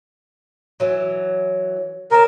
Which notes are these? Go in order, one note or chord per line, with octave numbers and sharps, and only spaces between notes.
E3 F#3
C#3 A#4 C5 A5